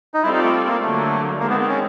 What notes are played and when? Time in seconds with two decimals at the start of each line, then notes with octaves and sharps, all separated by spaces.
0.14 D#4
0.23 G3 C4 E4 F4 A4 D5
0.33 D#4
0.43 A3
0.67 A#3
0.81 D3 F#3 A3 A#3
1.40 D#3 G#3 A#3 C4
1.50 B3
1.60 B3
1.69 C#4